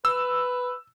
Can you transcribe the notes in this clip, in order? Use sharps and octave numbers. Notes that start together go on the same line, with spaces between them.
B4 E6